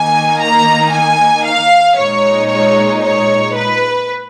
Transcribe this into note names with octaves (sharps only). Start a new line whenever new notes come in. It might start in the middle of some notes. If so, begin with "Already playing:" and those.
Already playing: D#3 A#3 D#4 G#5
A#5
G#5
F5
A#2 G#3 D#4 C#5
C#5
C#5
B4